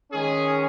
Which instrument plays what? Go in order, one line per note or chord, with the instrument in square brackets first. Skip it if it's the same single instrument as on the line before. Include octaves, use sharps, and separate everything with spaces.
[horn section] D#3 G#3 C#4 G#4